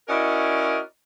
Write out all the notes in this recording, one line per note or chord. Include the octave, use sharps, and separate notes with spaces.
C#4 E4 F#4 A#4 D5 D#5